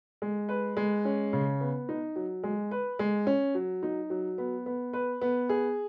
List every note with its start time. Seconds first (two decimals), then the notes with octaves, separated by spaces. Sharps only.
0.22 G#3
0.49 B4
0.77 G#3
1.05 C#4
1.33 C#3
1.61 B3
1.89 D#4
2.16 F#3
2.44 G#3
2.71 B4
2.99 G#3
3.27 C#4
3.55 F#3
3.83 D#4
4.10 F#3
4.38 B3
4.66 B3
4.93 B4
5.21 B3
5.49 G#4